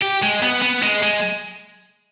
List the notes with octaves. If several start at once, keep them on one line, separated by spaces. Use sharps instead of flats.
G4
G#3
B3
B3
G#3
G#3